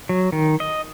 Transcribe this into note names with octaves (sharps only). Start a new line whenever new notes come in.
F#3
D#3
D#5